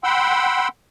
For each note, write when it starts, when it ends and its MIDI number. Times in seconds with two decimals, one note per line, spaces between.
0.04 0.68 78
0.04 0.68 79
0.04 0.68 83
0.04 0.68 84
0.04 0.68 88